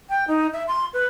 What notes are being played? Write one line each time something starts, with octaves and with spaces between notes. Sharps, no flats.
G5
D#4
E5
C6
B4